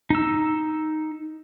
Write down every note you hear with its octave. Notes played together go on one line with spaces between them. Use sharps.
D#4 E6